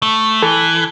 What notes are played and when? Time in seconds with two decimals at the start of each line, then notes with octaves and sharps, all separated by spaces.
0.03 A3
0.42 E3 A4